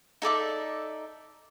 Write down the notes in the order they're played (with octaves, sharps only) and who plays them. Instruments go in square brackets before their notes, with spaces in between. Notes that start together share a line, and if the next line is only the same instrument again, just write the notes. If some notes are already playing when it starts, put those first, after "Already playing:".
[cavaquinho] D#4 A4 D5 E5